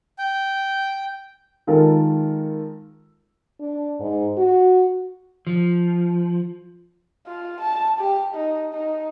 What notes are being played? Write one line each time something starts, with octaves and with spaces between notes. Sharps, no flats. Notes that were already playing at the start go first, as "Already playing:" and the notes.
G5
D#3 G#3 F4 A4 A#4
D4
G#2
F#4
F3
F4
A5
G4
D#4
D#4